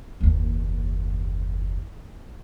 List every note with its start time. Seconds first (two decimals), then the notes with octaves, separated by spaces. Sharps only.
0.21 F#1 D#2